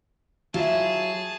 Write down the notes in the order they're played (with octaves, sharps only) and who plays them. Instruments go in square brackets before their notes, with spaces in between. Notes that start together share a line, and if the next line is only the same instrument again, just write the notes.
[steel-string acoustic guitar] F#3 [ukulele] E4 F4 [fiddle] G#4 A5